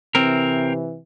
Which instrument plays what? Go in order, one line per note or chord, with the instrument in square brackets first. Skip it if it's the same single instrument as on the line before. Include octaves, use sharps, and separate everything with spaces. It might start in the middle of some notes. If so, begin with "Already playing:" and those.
[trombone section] C3 E3 [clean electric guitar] C4 A#4